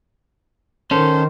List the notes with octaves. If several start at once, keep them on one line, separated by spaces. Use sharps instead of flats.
D#3 C#4 A4 C5